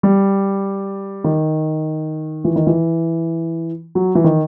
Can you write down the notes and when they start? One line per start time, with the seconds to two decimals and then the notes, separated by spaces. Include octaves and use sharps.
0.03 G3
1.24 D#3
2.45 E3
2.56 D#3
2.67 E3
3.95 F#3
4.15 E3
4.24 D#3